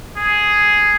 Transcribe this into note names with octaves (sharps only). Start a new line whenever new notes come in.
G#4